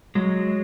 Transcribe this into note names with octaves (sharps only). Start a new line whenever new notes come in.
F#3 G#3